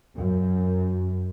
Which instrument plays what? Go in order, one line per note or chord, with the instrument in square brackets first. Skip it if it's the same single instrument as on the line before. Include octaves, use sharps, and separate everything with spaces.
[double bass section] F#2